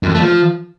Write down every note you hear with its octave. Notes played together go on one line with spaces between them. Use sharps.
F#2
F2
A3
F3